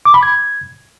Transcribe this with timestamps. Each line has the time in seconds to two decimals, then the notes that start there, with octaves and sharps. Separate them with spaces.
0.05 D6
0.14 B5
0.23 G#6